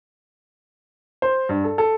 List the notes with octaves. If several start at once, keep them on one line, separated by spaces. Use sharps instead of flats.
C5
G2
A4
A4